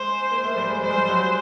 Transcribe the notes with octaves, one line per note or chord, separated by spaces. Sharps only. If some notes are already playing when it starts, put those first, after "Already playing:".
Already playing: G#3 C5
A#3
A3
G3
G#3
G3 C5
G#3
G3
F#3